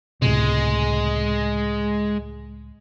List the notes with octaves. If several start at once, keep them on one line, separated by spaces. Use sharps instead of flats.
C#2 A2 C3 G#3